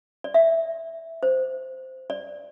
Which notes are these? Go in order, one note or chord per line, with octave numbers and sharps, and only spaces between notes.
D5
E5
C5
D5